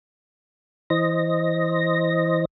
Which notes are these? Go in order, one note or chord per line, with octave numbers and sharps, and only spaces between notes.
E3 C5 D#5 A#6